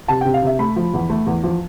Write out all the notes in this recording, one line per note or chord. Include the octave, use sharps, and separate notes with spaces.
C3 A5
C3 G5
F5
C3 E5
A3 B5
F3
E2
A3
E2
F3